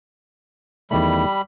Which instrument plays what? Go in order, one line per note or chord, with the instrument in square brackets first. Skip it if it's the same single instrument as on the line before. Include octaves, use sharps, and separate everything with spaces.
[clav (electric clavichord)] E2 D#3 A3 [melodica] G3 B5